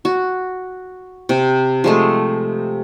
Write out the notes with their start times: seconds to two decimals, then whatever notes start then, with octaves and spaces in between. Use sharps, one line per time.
0.05 F#4
1.29 C3
1.84 F3 G#3 A3